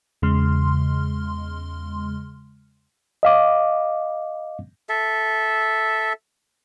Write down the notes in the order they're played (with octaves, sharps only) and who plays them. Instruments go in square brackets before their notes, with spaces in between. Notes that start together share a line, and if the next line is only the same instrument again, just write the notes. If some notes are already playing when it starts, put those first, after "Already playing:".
[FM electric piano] E2 C#3 G#3 C6 F6
[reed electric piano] D#5 F5 D6
[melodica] A4 E5